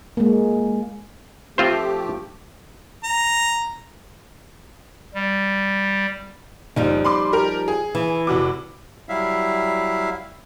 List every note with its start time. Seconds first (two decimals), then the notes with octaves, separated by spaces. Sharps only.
0.17 G#3 A#3
1.58 F3 A3 C4 F4 G4 C5
3.03 A#5
5.14 G3
6.76 F#1 F3 G3 D#4
7.05 B5 C6 D6
7.33 G4 A#4
7.68 G#4
7.95 E3
8.27 F1 F#4 D6
9.09 F#3 G3 E4 E5 F5